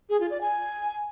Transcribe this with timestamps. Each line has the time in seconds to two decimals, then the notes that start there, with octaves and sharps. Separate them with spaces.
0.10 G#4
0.20 F4
0.31 D5
0.41 G#5